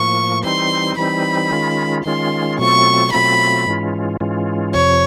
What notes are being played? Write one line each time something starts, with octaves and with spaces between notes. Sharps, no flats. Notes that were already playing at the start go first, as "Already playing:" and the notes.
Already playing: A2 F3 A#3 C#6
E3 G3 C4 D#4 C6
E3 G3 C4 D#4 B5
D#3 G#3 C#4 F4
D#3 G#3 C#4 F4 C6
B2 F#3 A3 C4 F4 C#6
B2 F#3 A3 C4 F4 B5
G#2 E3 G#3 C#4 F4
G#2 E3 G#3 C#4 F4
F2 C3 F3 C#5